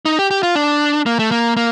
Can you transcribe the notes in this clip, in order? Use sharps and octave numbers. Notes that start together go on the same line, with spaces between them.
D#4
G4
G4
F4
D4
A#3
A3
A#3
A#3